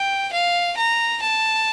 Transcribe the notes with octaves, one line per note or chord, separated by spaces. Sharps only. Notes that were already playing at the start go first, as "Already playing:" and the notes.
Already playing: G5
F5
A#5
A5